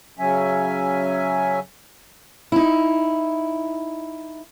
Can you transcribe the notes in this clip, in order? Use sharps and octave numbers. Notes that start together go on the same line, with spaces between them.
C#3 F#3 C#4 E5 G#5
D#4 E4